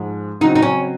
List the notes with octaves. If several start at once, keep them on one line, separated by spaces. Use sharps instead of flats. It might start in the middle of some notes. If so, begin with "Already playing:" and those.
Already playing: G#2 F3 G#3
C#3 F#3 C4 D#4
D#4
C#4